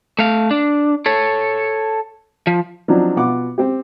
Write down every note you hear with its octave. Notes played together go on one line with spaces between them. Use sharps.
A3 F5
D4
A4 C#5
F3
F3 F#3 C4 D4 D#4
B2 F4 F#5 D6
C4 G4